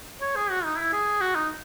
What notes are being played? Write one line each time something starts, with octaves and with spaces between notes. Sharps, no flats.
C#5
G#4
F#4
D#4
E4
G#4
F#4
D#4